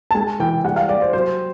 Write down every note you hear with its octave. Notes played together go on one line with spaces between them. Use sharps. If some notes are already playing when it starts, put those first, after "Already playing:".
A5
G#3 G#5
E3 G5
G3 F#5
F5
G3 D5
C5
F#3 C5